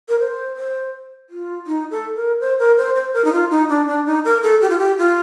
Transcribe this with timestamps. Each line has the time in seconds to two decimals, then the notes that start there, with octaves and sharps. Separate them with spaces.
0.09 A#4
0.19 C5
0.56 C5
1.30 F4
1.67 D#4
1.91 A4
2.16 A#4
2.40 C5
2.59 A#4
2.77 C5
2.95 C5
3.14 A#4
3.25 D#4
3.32 F4
3.51 D#4
3.69 D4
3.88 D4
4.06 D#4
4.25 A#4
4.43 A4
4.62 G4
4.70 F4
4.78 G4
4.98 F4